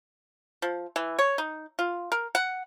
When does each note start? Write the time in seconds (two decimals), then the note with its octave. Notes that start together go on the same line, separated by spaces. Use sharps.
0.62 F3
0.96 E3
1.19 C#5
1.38 D#4
1.79 F4
2.12 A#4
2.35 F#5